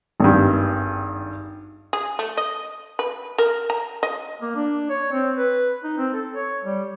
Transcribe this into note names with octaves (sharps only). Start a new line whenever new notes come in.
G#1 G2
G#4
A3
D#5
B4
A#4
A#5
D#5
A#3
D4
C#5
C4
B4
D#4
C4
A4
C#5
G3